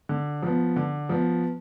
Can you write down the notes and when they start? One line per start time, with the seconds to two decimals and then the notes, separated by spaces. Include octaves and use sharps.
0.09 D3
0.42 F3 B3
0.76 D3
1.09 F3 B3